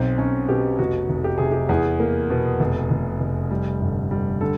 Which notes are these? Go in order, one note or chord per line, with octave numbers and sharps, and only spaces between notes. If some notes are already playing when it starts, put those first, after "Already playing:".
Already playing: B1 C4
B1 C#4
B2 G4
F1 F#4
F1
G4
C3 G#4
G4
E2 G#4
A#3
B2
F1
F1
F1
G3
G1
G3
D3 A4